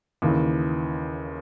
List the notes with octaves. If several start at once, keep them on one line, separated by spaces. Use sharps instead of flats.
D#2 C#3 E3